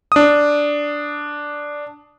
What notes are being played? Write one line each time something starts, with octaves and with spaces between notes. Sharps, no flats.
D4 D#6